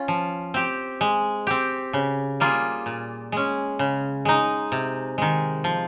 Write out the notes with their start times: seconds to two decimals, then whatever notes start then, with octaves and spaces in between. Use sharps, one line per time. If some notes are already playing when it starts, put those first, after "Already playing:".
Already playing: C#4 F4
0.08 F3
0.54 C4 G4
1.01 G#3
1.47 C4 G4
1.93 C#3
2.40 G3 A#3 F4 G#4
2.86 A#2
3.32 G#3 C#4
3.79 C#3
4.25 G#3 D#4
4.72 C3
5.18 D#3 G#3
5.64 F3